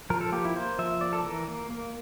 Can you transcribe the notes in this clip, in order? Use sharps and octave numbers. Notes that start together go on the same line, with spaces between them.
F3 A#4
A4
A#3 G4
E4
A#3 C5
F3 E5
A#3 D5
A4
E3 A#4
A#3
A#3